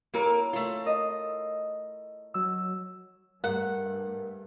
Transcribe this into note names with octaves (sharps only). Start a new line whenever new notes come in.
A#3 E4 A4 A#4 C#5
A3 F4
A#4 D#5
F#3 E6
G2 A3 A#4 F#5